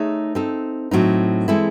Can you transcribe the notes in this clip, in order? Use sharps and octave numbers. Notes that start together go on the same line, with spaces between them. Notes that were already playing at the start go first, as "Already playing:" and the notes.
Already playing: A3 D#4 G#4 C#5 E5
C4 D#4 A4
A2 F#3 C4 D#4
E3 G#3 C4 E4 A4